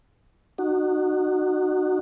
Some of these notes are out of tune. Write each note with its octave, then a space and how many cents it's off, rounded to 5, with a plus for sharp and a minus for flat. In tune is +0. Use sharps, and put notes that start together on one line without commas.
D#4 -35 F#4 +0